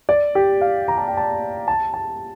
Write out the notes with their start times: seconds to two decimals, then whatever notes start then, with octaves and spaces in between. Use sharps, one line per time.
0.09 D5
0.35 G4
0.61 F5
0.88 A#5
0.98 A5
1.08 G5
1.17 A5
1.68 A5
1.94 A5